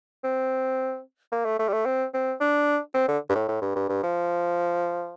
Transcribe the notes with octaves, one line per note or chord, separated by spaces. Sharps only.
C4
A#3
A3
A3
G3
A3
C4
C4
D4
C4
D3
G2
A2
A2
G2
G2
G2
F3